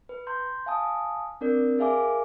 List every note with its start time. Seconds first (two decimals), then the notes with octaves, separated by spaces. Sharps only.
0.09 B4
0.27 A#5 C6 G6
0.66 F5 G#5 A5 D#6
1.41 C4 D4 A#4 D5
1.78 G#4 A#4 E5 F5 G#5 D6